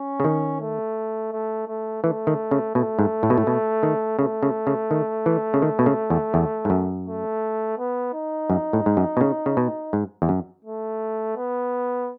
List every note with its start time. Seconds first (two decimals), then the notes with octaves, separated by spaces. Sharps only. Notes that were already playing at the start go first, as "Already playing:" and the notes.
Already playing: C#4
0.20 C#3
0.24 D#3
0.60 A3
1.32 A3
1.68 A3
2.03 E3 A3
2.27 D#3
2.51 C#3
2.75 B2 A3
2.99 G#2
3.23 A2
3.30 B2
3.38 A2
3.47 B2
3.83 D#3
4.19 C#3 A3
4.43 C#3
4.67 C#3
4.91 D#3
5.26 E3
5.54 C#3
5.62 D#3
5.79 B2
5.86 C#3
6.10 E2
6.34 E2
6.65 G#2
6.70 F#2
7.06 A3
7.78 B3
8.13 D#4
8.50 F#2
8.73 A2
8.86 G#2
8.97 F#2
9.17 B2
9.21 C#3
9.46 C#3
9.57 B2
9.93 G#2
10.22 E2
10.29 F#2
10.65 A3
11.36 B3